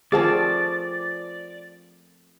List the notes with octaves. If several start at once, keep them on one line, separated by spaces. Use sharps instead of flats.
F3 A3 C4 G#4 A#4 D5 A5